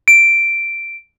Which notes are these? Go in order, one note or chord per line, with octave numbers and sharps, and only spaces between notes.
D7